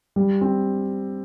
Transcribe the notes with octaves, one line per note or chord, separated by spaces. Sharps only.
G3
C4